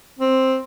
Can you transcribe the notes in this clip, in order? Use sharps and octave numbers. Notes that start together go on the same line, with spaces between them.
C4